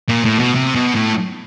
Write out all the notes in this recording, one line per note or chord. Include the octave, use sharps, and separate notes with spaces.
A#2
A2
B2
C3
B2
A2